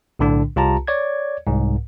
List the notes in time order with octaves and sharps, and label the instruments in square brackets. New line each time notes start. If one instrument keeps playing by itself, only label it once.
[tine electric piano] B1 A2 D3 D4
C2 F4 G4 A5 A#5
C#5 D5 G#6
C2 G#2